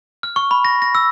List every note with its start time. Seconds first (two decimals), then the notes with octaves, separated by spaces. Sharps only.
0.23 F6
0.36 C#6
0.51 B5
0.65 A#6
0.82 A#6
0.95 E6